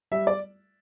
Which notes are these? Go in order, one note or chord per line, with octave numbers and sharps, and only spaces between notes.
G3 E5
D5